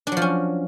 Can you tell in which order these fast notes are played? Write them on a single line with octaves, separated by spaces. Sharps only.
D4 F#3 F3 C#4